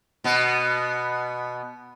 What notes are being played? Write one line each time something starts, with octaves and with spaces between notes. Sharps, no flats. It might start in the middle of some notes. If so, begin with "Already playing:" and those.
B2 B3